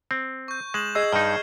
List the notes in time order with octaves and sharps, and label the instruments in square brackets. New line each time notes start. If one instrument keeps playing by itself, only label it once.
[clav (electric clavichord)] C4
[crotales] C#6 G6
[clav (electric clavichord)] G#3 [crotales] E7 F#7
[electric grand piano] G#4 D#5 E6 [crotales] G#6 C7
[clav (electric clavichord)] G2 D#4 [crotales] F6